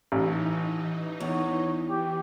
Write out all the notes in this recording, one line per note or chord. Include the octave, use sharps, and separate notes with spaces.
A1 E3 D#4
E2 C#5
E3 G4